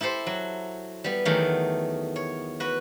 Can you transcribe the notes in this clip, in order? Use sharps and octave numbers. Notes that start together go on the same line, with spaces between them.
E4 G4 A4 C5
F#3
G3 B3
E2 D#3 F#3 A3 G5
C#5
F#4 B4